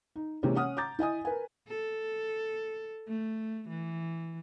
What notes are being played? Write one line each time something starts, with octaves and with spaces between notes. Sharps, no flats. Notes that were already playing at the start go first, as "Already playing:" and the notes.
D#4
C3 E3 G#3 A#3 C#4
C#4 F#5 D#6 F6
A#5 D6 G6 A6
E4 D#5 G#5 D#6
A#4 B4 G#5
A4
A3
E3